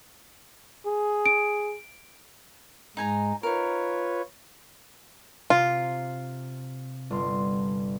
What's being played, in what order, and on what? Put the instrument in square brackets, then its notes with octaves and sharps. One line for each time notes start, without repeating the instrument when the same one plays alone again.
[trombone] G#4
[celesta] D7
[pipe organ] G#2 G#3 [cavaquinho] D#4 G#5 A#5
[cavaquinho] D#4 A#4 [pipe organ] F4 B4 C#5
[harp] C3 [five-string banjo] F4
[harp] G1 C6